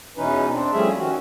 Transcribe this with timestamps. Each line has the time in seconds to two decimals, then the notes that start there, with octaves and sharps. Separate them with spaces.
0.17 E2 B2 E3 C#4 D#4 B4
0.51 C4 D4
0.73 F3 G3 A3 C#4 G#4 E5
0.97 D#3 C#4 F#4